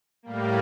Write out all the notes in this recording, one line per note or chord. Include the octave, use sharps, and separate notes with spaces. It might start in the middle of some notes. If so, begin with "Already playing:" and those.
A2 G3 A#3